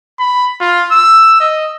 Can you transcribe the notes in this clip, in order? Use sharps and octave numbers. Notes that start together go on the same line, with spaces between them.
B5
F4
E6
D#5